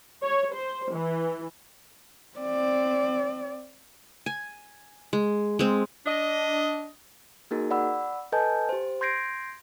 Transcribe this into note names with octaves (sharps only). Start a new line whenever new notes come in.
C#5
C5
E3
C4 D5
G#5
G#3
G#3 C4
D4 D#5
A#3 D#4 F#4 G#4 A#4
D5 F#5 B5 E6
A4 B4 D#5 G#5 A5 G6
G4 C5
C6 G6 G#6 A#6 C7 D7